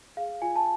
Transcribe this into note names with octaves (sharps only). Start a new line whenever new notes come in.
G#4 F5
F4 G#5
A5